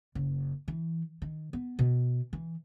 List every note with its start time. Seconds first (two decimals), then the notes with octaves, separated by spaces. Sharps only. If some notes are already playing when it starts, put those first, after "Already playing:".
0.15 F#1
0.68 E3
1.22 D#3
1.53 B3
1.79 B2
2.33 E3